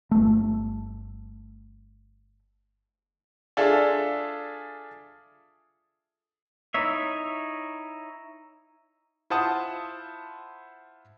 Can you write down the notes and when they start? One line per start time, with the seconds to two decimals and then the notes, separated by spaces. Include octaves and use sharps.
0.11 G1 A3
3.57 D4 F4 G#4 A4 E5
6.74 D#4 E4 C#5 E5
9.30 E4 F4 C5 F#5 A5 D#6